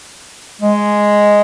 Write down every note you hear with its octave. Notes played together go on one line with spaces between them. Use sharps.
G#3